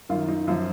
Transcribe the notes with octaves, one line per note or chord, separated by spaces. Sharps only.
F#2 D#3 F4
D#4
F#2 F3 F4